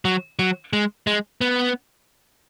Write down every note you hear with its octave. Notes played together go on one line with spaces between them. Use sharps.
F#3
F#3
G#3
G#3
B3